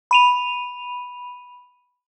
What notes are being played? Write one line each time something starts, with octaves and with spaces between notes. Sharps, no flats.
B5 D#7 F7